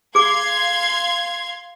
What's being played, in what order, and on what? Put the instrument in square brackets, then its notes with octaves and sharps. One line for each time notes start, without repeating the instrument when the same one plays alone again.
[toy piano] G#4 D6 [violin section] F5 C6 G#6